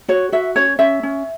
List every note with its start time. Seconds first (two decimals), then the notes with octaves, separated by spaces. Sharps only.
0.08 F#4 C#5
0.32 F#4 E5
0.56 C#4 C#5
0.79 C#4 E5
1.03 C#4